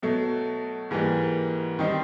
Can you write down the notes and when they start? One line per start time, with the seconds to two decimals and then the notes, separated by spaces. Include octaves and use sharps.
0.02 B2 F#3 A3
0.91 G#2 E3 G3 A#3
1.79 D#3 G3 C4 D#4